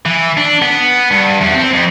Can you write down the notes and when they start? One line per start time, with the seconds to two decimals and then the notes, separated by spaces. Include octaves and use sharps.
0.06 E3
0.37 D4
0.62 B3
1.11 G2
1.41 E2
1.54 C4
1.73 F2